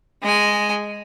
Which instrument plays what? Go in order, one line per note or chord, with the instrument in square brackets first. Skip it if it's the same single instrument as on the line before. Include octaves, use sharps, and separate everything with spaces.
[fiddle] G#3 G#5